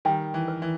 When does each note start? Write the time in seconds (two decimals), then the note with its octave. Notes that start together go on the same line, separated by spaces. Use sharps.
0.05 D#3 G3 G5
0.34 E3
0.48 B4
0.62 E3